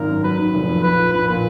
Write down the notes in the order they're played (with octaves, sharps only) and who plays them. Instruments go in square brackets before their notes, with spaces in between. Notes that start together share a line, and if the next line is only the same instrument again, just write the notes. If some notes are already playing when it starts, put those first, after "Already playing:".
Already playing: [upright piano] G#1 D#3 [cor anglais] A#4
[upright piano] F#2
[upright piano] F#3 [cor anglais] B4
[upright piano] D#3 [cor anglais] B4
[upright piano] F1
F2
[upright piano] A#1 [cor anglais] B4
[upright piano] F3
[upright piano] A#1 [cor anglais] B4
[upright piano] A#2 [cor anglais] B4